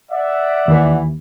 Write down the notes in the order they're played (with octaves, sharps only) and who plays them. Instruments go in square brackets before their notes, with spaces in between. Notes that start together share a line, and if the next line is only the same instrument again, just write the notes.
[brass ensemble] D5 E5 [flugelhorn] F#5
[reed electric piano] D#2 [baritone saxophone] E3